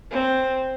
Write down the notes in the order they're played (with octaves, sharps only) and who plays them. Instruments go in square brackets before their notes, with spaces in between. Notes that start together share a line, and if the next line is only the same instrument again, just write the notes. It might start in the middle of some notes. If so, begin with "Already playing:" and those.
[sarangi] C4